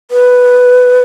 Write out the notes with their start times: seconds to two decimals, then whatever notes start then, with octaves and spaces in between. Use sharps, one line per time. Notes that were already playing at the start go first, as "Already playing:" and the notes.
0.11 B4